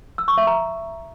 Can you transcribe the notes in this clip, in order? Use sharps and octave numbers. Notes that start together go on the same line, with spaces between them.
E6
C#6
E5
A#5